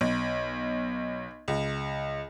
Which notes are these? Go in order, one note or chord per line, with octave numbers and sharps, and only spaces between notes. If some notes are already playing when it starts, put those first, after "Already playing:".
B1
C#2